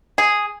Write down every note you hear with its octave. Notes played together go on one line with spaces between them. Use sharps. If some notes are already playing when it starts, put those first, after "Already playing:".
G#4